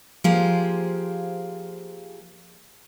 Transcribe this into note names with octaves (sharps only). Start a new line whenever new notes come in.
F3 A#3 G4 G#4 C5